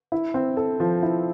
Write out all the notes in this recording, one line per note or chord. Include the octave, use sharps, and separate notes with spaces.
E4
C4
A4
F3
E4